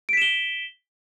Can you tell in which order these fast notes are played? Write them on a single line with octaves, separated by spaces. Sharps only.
D7 B6 E7 G7